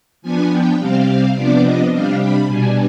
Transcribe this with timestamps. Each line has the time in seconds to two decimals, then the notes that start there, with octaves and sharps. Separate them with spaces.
0.22 F3 B3 D4 G#5
0.51 G5
0.78 C3 G3 C4 F5
1.35 C3 F3 B3 D4 D5
1.63 D#5
1.91 C3 G3 D4 F5
2.19 B5
2.48 B2 G3 D4 G#5